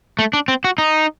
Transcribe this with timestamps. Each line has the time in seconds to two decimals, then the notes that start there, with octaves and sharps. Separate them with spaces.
0.19 A3
0.33 D4
0.48 C4
0.64 F#4
0.78 D#4